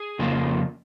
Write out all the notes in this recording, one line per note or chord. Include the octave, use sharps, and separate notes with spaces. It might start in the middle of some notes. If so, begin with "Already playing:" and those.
Already playing: G#4
F2 C#3 F3 A#3